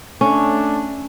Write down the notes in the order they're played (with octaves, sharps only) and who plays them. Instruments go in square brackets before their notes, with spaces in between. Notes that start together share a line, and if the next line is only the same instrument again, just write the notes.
[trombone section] A3 D4 [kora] C#4